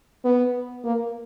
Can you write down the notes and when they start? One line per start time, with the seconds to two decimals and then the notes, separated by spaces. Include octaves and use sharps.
0.25 B3
0.84 A#3